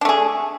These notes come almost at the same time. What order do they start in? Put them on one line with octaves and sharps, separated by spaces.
D4 A3 G#4